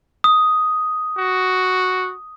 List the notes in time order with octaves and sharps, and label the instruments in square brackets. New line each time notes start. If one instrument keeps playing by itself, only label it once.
[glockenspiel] D#6
[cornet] F#4